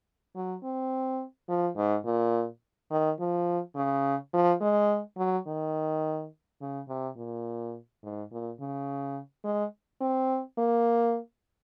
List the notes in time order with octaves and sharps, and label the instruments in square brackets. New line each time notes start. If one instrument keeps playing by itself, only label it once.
[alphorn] F#3
C4
F3
G#2
A#2
D#3
F3
C#3
F3
G#3
F#3
D#3
C#3
C3
A#2
G#2
A#2
C#3
G#3
C4
A#3